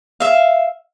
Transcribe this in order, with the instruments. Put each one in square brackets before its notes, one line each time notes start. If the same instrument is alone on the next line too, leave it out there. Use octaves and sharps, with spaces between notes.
[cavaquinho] E5 F5